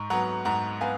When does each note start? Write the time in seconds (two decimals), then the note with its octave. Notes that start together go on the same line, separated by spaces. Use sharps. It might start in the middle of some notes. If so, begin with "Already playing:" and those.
Already playing: G#2 A#5 C#6
0.10 F#3 B3 F#5 A#5
0.45 G#2 F#5 A#5
0.81 B3 F5 G#5